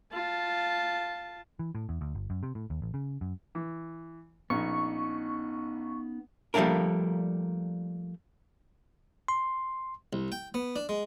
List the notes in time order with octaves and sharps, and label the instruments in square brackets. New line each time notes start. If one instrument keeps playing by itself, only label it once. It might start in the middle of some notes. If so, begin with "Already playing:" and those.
[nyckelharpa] F4 A5
[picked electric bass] E3
A2
E2
D2
G1
F#2
C3
A2
D#2
A1
C#3
F#2
[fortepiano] E3
[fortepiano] A#1 [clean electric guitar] B3 C#4 D#4 [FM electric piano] C#6
[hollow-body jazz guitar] F3 G3 A3 A#3 D4 A#4
[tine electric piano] C6
[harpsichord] C2
G5
B3
D4
G#3